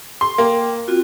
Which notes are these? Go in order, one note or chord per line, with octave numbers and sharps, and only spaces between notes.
C6
A#3 G5 C6
C4 F4 F#4